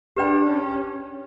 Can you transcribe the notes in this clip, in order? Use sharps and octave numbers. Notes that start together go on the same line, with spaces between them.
D4 G4 B4 D5 G5 B5
C#4